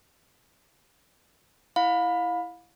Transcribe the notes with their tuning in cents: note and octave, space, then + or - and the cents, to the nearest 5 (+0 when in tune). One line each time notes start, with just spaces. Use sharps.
E4 +0 F5 +35 B5 +0